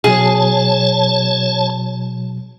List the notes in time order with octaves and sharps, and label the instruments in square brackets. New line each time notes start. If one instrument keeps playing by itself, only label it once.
[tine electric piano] B2 F#3 [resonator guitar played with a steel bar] G#4 [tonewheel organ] C#5 A5